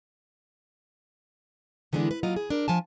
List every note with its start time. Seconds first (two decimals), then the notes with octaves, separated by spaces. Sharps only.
1.93 D3 E3 G#3 B3 D4
2.11 B4
2.23 F#3 A#3 F4 D#5
2.36 G#4
2.50 D4 A#4
2.68 F3 G#5 A5